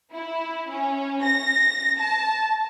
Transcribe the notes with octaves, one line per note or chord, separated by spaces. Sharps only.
E4
C#4
A#6
A5